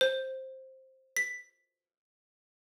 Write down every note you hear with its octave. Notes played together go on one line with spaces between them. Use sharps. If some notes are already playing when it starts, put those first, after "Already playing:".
C5
B6